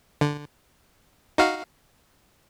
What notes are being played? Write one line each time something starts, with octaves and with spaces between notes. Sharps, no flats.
D3
D#4 F#4 F5